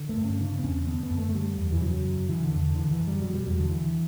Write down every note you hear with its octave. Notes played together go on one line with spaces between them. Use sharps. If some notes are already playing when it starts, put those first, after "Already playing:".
Already playing: D3
A3
G2
C#4
C#3 D4
B3
E2 C#4
D3 B3
B3
F#2
A3
A3
D3 G3
E2
E3
C#3 F#3
F#2
D3 E3
D3
E2
D3
D3 E3
E3
F#2
G3
B2 F#3
G3
E2 F#3
D3
D3 E3